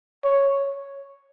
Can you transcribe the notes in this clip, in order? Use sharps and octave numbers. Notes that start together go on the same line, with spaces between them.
C#5